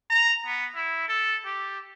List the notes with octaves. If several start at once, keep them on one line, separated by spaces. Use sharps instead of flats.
A#5
B3
E4
A4
G4